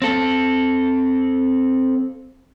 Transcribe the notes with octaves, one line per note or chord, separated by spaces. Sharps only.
C4 A4